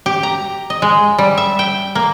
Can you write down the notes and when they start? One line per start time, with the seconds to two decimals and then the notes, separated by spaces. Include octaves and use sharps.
0.06 G4
0.23 A#5
0.70 D#5
0.82 G#3
1.18 G3
1.37 E5
1.59 G5
1.95 A#3